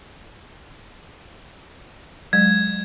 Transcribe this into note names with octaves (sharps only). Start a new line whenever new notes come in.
F#3 G#3 G#6